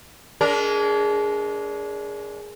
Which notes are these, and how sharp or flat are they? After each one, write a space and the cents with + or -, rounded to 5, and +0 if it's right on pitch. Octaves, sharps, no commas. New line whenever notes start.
G#3 +0 D4 -35 A#4 +0